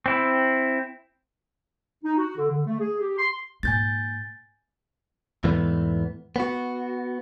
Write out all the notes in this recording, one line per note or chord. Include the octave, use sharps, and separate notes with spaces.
C4 E4
D#4
F#4
D3
D3
A3
G#4
G4
C6
G#2 A#3 G#5 G6 A6
E2 G#2 E3 A3 B3
B3 F#4